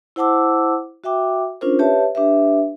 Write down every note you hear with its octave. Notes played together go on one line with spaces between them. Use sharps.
E4 C5 F#5 A5 D6 E6
F#4 E5 G5 D6
C#4 D4 F4 A#4 C5
G4 B4 C#5 E5 A5
D4 G4 B4 E5